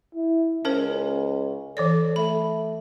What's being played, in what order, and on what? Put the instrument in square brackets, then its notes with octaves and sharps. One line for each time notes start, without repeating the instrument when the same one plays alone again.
[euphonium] E4
[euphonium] C#2 [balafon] C#4 A#4 C5
[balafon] E3 C#5 D5 [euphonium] A4
[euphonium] A3 [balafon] B5